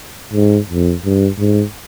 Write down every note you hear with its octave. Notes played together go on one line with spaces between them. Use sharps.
G#2
F2
G2
G#2